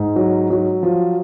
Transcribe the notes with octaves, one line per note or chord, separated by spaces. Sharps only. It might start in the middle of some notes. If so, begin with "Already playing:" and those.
Already playing: G#2
F#3
F#3
F3